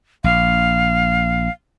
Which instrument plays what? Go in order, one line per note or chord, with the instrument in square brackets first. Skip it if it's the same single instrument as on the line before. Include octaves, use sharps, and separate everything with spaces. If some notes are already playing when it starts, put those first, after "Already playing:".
[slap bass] A#1 [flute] F5